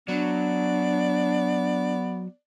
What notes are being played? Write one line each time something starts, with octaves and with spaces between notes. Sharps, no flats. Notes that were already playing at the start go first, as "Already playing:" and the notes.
F#3 B3 D4 D5